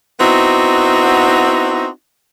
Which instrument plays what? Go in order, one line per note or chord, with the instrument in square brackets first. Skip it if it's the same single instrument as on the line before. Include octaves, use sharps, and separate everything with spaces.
[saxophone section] B3 C4 D#4 E4 F#4